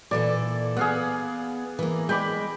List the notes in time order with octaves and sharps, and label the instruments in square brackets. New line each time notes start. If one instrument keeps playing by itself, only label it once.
[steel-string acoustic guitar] A#2 E3 A4 [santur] D5
[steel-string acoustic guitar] B3 [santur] G#4 F5 F#5
[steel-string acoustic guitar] E3 A#3
[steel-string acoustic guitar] G#3 [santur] G5 B5 D6